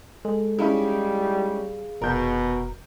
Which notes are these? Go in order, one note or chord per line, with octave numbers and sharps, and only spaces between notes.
G#3 A4
G3 C#4 D#4 E4 G#4 F5 B5
F1 B2 A#4 G6